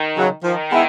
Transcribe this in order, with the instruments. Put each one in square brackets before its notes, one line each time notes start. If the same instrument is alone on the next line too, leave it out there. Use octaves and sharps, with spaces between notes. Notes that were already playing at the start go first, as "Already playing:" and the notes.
Already playing: [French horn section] D#3
[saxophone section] C#3 F#3
[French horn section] D#3 [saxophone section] F3
[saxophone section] G#3 B3 E4